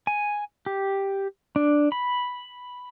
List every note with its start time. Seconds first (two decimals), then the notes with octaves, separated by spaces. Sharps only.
0.07 G#5
0.66 G4
1.56 D4
1.92 B5